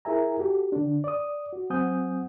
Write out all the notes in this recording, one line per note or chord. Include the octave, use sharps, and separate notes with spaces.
E4 G#4 A#4 E5 G#5 A#5
F#4 G4 A4
D3 D4
D5 D#6
F#4
F#3 C4 F#5 G#5 D#6 G6